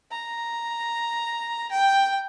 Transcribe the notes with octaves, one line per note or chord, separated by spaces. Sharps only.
A#5
G5